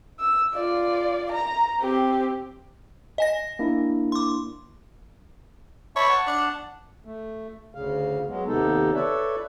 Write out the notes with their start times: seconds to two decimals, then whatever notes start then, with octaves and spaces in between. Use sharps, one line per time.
0.20 E6
0.54 F4 D5
1.31 A#5
1.81 C4 G4
3.18 D#5 G#5 A#6
3.59 A#3 D4 E4
4.12 C6 D6
5.96 C#5 E5 A5 B5
6.09 F#5 A5
6.27 D4
7.05 A3
7.75 D2 C#3 F5
8.28 F#3 G#3 B3
8.48 D#2 C3 B3 D#4 A4
8.94 A4 B4 C#5 D5 E5